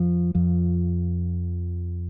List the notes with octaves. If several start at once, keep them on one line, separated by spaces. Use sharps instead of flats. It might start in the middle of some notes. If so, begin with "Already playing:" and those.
Already playing: F2 F3
F2 F3